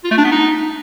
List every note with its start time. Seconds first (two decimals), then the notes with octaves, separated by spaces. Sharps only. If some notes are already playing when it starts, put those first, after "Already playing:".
0.04 F4
0.11 A3
0.18 D4
0.25 B3
0.31 D#4